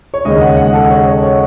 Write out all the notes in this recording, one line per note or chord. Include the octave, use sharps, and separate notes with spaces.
C#5
D#2 C#3 G#3 C#4 D#5
F#5
F#5
A4
C#5
C#5
C#5